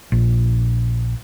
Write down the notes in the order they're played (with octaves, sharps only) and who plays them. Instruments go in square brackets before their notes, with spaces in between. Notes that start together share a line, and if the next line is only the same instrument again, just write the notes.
[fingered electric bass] A#1